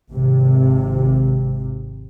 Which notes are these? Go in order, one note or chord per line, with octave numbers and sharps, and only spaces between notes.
G#1 C3